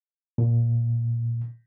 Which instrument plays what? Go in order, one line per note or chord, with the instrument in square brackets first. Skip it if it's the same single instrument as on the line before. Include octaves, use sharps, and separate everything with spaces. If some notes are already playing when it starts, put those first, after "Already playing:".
[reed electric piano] A#2